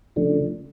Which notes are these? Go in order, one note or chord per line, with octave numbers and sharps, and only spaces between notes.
C#3 F3 A3 D4